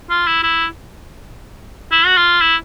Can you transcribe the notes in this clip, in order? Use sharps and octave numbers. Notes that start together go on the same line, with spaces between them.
F4
E4
E4
E4
F#4
F4
E4